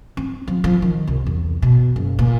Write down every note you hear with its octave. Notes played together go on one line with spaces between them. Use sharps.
C4
F3
F3
D#3
C2
E2
B2
F#1
A#2